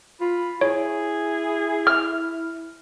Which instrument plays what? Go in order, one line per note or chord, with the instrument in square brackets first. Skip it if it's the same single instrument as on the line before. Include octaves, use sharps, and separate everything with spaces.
[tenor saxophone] F4 [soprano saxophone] B5
[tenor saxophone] E4 [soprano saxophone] G#4 [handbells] C#5
[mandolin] F6